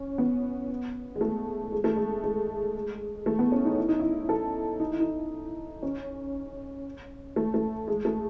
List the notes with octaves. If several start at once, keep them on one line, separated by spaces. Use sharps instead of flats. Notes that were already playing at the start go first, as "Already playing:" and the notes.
Already playing: C#4
B3
G#3
A3
G#3
A3
G#3
G#3
A3
B3
C#4
D#4
E4
D#4
E4
A4
D#4
E4
D#4
C#4
A3
A3
G#3
A3